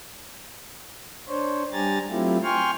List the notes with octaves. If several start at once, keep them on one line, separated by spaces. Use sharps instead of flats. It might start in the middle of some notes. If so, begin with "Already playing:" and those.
D4 C5 C#5
G3 D4 G4 G#5 A#5 A6
F#3 A3 C4 E4 F4 G4
G5 G#5 C6 C#6 F6